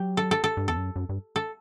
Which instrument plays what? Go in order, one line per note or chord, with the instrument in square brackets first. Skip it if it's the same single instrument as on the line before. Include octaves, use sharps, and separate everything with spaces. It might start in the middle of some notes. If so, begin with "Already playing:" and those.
Already playing: [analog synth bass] F#3 [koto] G4
[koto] A4
A4
A4
[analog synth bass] G2
[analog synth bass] E2 [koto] A4
[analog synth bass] F#2
F#2
G2
[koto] A4